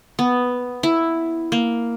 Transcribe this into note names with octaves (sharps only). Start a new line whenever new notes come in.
B3
E4
A#3